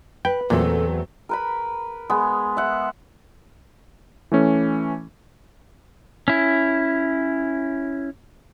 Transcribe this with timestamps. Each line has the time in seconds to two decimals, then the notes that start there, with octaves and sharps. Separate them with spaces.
0.25 B4 G5
0.50 E2 A#2 F#3 A3 C4 A4
1.29 A#4 B4 B5
2.10 G#3 B3
2.57 E5 F#5
4.32 E3 A3 C#4
6.28 C#4 E4